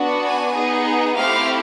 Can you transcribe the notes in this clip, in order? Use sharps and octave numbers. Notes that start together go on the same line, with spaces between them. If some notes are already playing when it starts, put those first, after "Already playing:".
Already playing: B3 D4 F#4
G#5
B3 D#4 G#4
A3 C4 E4 G4 F5